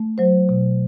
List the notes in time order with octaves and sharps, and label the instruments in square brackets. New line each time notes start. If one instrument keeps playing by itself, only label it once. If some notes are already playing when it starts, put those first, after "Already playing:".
Already playing: [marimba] A3
F#3 C5
B2